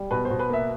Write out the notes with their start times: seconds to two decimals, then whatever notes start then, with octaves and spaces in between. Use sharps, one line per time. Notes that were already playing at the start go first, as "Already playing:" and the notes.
Already playing: G3
0.11 B2 B4
0.25 C5
0.30 B2
0.39 B4
0.49 A#3 E5